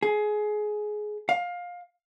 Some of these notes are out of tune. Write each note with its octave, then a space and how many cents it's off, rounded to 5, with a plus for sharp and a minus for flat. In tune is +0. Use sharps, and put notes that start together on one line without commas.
G#4 +20
F5 +20